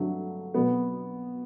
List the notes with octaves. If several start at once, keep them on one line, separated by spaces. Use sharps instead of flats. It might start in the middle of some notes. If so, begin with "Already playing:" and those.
Already playing: G2 D3 F#3 A3
B2 F#3 B3